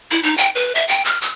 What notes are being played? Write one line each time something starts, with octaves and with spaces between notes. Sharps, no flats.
E4
D#4
G5
B4
E5
G5
F6
E6